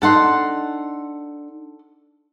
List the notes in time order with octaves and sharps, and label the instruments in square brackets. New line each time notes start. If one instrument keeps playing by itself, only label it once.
[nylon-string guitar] D4 D#4 [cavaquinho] A4 F#5 C6